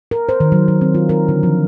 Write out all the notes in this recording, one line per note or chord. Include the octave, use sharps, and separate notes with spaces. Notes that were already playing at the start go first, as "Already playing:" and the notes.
A#4
C5
D#3
F#3
F#3
C4
F4
A#4
D3
F3